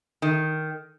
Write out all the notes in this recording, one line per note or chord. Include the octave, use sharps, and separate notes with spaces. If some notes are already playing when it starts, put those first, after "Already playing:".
D#3